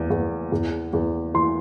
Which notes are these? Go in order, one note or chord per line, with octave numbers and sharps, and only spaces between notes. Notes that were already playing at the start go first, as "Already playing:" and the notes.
Already playing: E2
E2
E2
E2
E3 C6